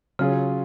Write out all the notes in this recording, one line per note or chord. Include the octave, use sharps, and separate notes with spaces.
C#3 F#3 C#4 F4 G#4